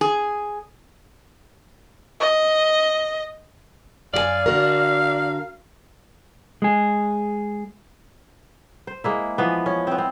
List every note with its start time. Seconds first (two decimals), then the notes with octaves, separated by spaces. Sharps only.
0.01 G#4
2.20 D#5
4.14 F#2 G4 D5 F5 G#5
4.46 D3 F#4 A#4
6.62 G#3 G#4
8.87 C5
9.04 G#3 A#3 E4
9.38 E3 F3 B3
9.66 C#4
9.87 B3 C4
9.98 C4